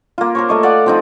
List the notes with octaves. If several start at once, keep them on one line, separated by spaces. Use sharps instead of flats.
A#3 F4
A#4 C5 C#5
A3 D#5 C#6
D5 F5 F#5
F3 C4 D#4